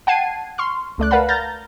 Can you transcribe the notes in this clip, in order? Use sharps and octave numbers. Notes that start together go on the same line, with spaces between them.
F#5 G5 A5 G#6 C7 D#7
C6 C#6 F6
C#2 A3 D5 F#6
A#4 B4 F5 F#5 A5 B5
A#5 F6 G6 A6 A#6